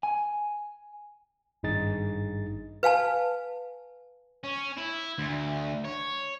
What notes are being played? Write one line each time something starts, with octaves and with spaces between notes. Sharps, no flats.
G#5
G#1 G2 D#4 G#4 A6
B4 F5 G#5 A5
C#4
E4
D2
C#5